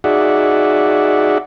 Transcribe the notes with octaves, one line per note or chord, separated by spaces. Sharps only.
D#4 F#4 G#4 D5 E5 F#5